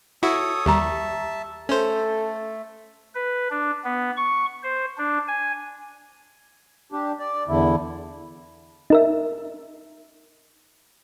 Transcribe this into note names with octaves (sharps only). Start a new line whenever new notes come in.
E4 F#4 A4 C#5 D#6
D#2 G3 G4 E5 A5 A#5
A3 C#4 A4 C5
B4
D4
B3
C#6
C5
D4
G#5
D4 G4
D5
E2 D3 E4
D#4 A#4 E5